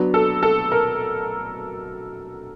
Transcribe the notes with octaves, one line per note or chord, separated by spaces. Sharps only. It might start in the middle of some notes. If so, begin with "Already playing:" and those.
Already playing: F#3 B3 D4
A4
A4
A#4